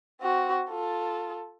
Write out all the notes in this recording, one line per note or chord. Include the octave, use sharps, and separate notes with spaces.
C4 F#4
F4 A4